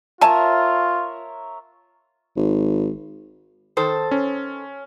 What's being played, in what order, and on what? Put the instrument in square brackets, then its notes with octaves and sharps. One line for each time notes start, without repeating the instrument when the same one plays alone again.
[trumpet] F4 [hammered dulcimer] A#4 C#5 E5 [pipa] G#5 A5
[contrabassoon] G#1
[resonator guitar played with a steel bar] D#3 A4 C5
[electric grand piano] C#4